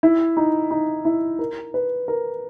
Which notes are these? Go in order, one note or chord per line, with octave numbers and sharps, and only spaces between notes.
E4
D#4
D#4
E4
A#4
B4
A#4